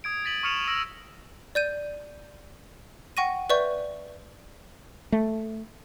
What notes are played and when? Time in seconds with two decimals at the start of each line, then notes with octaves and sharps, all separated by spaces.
0.04 D#6 G#6 D7
0.24 G#6 A6 B6 D#7 F#7
0.43 C#6 D#6 F6 C#7 E7 F7
0.68 E6 A#6 D7 F7
1.55 D5 G6 D#7
3.17 F#5 G5 C#6 A#6 D#7
3.50 B4 D5 E5 C#6 G6
5.12 A3